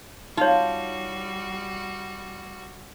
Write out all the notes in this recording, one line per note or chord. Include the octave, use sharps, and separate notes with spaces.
G3 D#4 F4 F#4 C#5